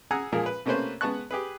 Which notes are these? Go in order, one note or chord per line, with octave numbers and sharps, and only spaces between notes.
G#4 F#5 G#5 A#5 E6
A#2 F3 G#3 G#4 A#4
B4
C3 A3 A#3 C#4 B4 C5
G#3 B3 B4 A5 C#6 F#6
G4 G#4 B4